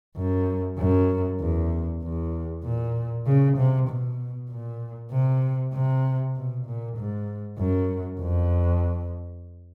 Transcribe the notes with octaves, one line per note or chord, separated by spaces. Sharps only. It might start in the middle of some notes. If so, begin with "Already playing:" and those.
F#2
F#2
E2
E2
A#2
C#3
C3
B2
A#2
C3
C3
B2
A#2
G#2
F#2
F2